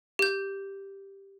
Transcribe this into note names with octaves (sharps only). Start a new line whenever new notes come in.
G4 G6